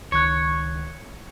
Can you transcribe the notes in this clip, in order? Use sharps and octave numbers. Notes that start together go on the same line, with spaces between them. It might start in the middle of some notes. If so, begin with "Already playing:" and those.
C#2 D#3 C#5 F#6